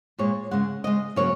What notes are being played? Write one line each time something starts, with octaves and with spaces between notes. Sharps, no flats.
A#2 G#3 C#5
C#3 G#3 F#5
C#3 G#3 D#5
C#3 F#3 A#3 C#5